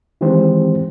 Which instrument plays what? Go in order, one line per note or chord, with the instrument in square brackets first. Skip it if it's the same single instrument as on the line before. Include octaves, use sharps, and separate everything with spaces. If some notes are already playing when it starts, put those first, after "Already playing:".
[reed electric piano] D#3 E3 G#3 C4 G4 C5